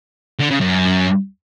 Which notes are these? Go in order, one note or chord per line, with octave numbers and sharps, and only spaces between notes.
D3
C#3
F#2